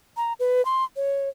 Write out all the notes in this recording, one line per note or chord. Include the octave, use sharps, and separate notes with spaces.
A#5
B4
C6
C#5